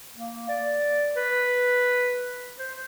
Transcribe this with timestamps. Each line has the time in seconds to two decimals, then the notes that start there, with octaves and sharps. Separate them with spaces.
0.16 A#3
0.49 D5
1.17 B4
2.59 C5